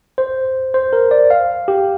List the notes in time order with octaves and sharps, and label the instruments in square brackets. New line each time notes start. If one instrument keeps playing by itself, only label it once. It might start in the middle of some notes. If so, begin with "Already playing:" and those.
[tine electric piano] C5
C5
A#4
D5
F5
G4